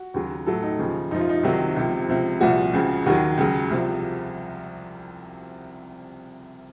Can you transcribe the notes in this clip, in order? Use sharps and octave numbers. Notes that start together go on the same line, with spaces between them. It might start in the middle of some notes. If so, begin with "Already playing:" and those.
Already playing: F#4
D#2 C#3 F#3
A2 F#3 A4
D#4
D#2 C#3 F3
F#2 F3 D#4
F4
D#4
C2 C3 D#3 F#3
C#2 C3 F3
C#2 C3 F3
C2 A#2 F3 F#4
C#2 C#3 F3
D#2 D#3 F#3 F#4
C#2 C#3 F#3
C2 C3 F3